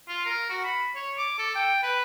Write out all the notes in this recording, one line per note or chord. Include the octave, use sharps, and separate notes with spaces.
F4
A#4
F#4
B5
C#5
D6
A4
G5
B4